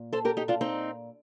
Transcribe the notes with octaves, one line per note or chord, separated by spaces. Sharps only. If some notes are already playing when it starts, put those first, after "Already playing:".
Already playing: A#2
A4 C5
G4 A#4
D#4 G4
D4 F4
C4 D#4